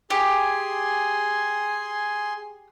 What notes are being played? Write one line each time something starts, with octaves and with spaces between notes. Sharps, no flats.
G4 G#4 G#5 C6